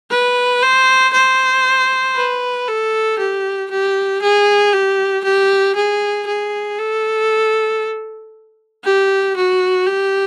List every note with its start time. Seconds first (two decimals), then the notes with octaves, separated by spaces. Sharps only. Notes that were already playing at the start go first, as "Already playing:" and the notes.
0.11 B4
0.63 C5
1.13 C5
2.16 B4
2.68 A4
3.18 G4
3.70 G4
4.22 G#4
4.73 G4
5.24 G4
5.75 G#4
6.27 G#4
6.79 A4
8.85 G4
9.36 F#4
9.86 G4